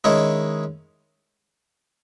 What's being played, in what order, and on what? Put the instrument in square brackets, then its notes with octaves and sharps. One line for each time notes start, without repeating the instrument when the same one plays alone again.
[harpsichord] D#3 G#3 C#4 E4